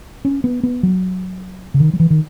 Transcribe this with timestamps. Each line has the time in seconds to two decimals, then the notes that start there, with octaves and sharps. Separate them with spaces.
0.25 C#4
0.44 B3
0.63 B3
0.83 F#3
1.74 C#3
1.80 D#3
1.93 F#3
2.00 E3
2.10 D#3